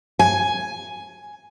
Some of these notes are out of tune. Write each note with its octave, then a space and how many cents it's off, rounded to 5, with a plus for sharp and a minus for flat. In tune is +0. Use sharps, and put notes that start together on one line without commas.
G#5 +5